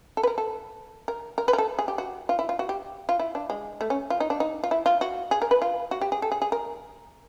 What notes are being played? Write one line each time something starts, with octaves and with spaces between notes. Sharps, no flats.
A4
B4
A#4
A4
A#4
A#4
B4
A#4
A4
G#4
G4
F#4
F4
E4
F4
F#4
G4
F4
E4
D4
G#3
A3
C#4
F4
D#4
D4
D#4
F4
E4
F4
F#4
G#4
A#4
B4
F4
F#4
G4
G#4
A4
G#4
G#4
A#4